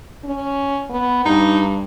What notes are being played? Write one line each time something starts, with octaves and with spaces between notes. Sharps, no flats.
C#4
B3
G2 D#4